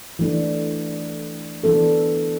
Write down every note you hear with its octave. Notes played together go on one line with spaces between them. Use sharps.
E3 A3 D4
E3 B3 D4 A4